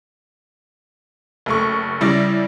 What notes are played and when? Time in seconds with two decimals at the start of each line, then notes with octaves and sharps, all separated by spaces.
1.46 F#1 A3 C#6
2.01 C#3 G3 E4 D5 A#6